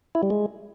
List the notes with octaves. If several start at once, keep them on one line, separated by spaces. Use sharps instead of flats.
E4
G3
G#3